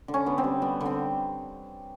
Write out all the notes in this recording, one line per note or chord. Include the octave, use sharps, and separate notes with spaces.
D3
C#4
D3 B3
C4
G3
G3 B3
D3
C4